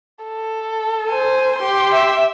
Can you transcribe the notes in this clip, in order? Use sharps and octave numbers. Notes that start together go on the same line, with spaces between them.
A4
C5 G#5
G4 C6
E5